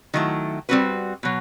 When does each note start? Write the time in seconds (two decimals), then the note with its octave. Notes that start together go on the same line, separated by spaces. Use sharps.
0.14 D#3 F#3 A3 E4
0.69 G3 C4 F#4 B4
1.23 B2 F#3